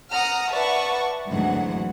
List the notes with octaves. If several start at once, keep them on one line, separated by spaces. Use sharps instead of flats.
F#5 A#5 D#6 F6
B4 D5 E5 F#5 A5 C#6
G#1 D2 G#2 E3 F#3 F#5